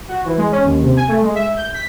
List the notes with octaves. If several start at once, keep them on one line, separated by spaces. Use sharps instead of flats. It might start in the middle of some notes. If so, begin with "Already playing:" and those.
F#4
E3
G#3
C#4
D#2
C3
G#5
A3
G#3
E5
G6
B6